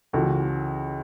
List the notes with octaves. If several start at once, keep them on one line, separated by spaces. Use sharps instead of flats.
C#2 C#3 E3 F#4 A4